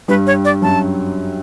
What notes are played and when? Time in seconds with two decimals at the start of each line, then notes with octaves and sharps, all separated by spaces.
0.08 G2 G3 B4
0.27 C#5
0.45 D5
0.62 F#2 F#3 A5